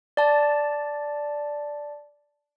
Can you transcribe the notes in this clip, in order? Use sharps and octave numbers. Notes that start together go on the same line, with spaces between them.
D5 A5